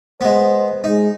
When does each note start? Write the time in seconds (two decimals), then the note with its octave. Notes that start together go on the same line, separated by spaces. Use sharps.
0.21 G#3 B3 C5
0.84 G#3 D#4